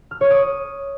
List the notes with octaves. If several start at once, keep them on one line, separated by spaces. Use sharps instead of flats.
F6
C#5
D#6